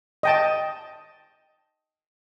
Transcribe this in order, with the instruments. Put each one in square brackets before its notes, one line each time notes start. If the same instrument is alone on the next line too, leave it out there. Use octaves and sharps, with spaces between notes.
[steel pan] D#5 G5 A5